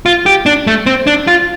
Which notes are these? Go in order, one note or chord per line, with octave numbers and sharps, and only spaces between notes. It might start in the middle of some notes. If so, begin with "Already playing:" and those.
F4
G4
D4
A3
C4
D4
F4